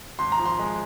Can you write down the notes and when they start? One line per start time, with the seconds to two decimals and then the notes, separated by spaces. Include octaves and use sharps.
0.19 G#1 C6
0.32 A#5
0.39 F3
0.46 C6
0.59 G#3